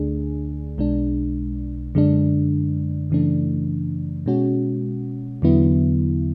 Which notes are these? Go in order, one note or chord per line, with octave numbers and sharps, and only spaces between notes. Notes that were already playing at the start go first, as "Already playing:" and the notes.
Already playing: D2 D3 A3 D4 G#4
B1 B2 G#3 D4
F#2 D3 G#3 D4
F#2 C#3 E3 A3 D4
B2 G#3 C#4 F#4
E2 D3 F#3 B3 E4